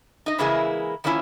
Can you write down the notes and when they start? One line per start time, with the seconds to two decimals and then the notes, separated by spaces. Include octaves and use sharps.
0.26 D#4 D#5
0.38 C#3 E3 G#3 A#3 E4 G#4
1.04 D#3 F3 A#3 C#4 E4 F4